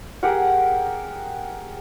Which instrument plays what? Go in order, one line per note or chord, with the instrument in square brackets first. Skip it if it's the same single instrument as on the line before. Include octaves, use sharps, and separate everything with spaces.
[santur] G4 G#4 A#4 F#5